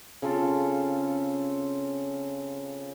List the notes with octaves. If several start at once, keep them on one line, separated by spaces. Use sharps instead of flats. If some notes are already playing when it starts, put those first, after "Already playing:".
C#3 C4 F4 A4